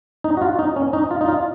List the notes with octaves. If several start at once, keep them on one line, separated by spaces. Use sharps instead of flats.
D#4
F#4
F4
D#4
C#4
D#4
F4
D#4
F4